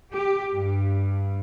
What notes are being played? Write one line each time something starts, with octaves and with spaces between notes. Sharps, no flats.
G4
G2